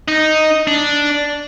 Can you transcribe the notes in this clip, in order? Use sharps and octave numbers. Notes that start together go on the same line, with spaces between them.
D#4
D4